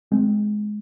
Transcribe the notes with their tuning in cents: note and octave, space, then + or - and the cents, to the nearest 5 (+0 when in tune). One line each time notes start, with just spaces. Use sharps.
G#3 +15 C4 -20